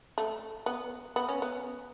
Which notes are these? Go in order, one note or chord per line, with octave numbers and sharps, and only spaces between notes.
A3
B3
B3
C#4
B3